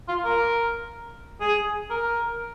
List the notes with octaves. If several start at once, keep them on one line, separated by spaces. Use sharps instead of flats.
F4
A#4
G#4
A#4